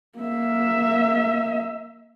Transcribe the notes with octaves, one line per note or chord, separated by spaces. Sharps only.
A#3 E5